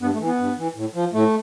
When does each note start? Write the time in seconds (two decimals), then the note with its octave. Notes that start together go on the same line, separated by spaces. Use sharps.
0.01 G2 B3
0.13 A3
0.20 E3
0.26 B3
0.39 G2
0.58 E3
0.76 A2
0.95 F3
1.13 A2 A3